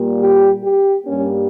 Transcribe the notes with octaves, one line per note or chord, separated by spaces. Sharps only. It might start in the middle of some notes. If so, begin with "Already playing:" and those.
Already playing: A#2 G3 A#3
G4
G4
G2 G3 A#3 C#4